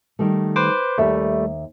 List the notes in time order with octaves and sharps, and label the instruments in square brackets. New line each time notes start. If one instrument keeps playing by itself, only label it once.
[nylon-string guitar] D#3 G3 A3
[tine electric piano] B4 C5 D6
[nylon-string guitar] D#2 E5 [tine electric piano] G3 A3